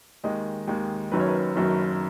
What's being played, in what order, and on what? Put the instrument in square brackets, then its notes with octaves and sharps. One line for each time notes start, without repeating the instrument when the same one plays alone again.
[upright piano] D#2 D#3 G#3 D#5
D#2 D#3 G#3
F#1 F#2 D#3 F#3 B4
C#5
B4
F#1 F#2 D#3 F#3